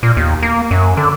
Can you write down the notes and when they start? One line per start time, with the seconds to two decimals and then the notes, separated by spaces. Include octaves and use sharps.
0.03 A#2
0.17 D#2
0.42 A#3
0.71 F#2
0.97 D3